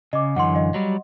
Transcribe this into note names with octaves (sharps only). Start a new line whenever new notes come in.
C#3 D#5 D6
F#2 D3 E3 F#5 C6
D#5 F5
F#3 G3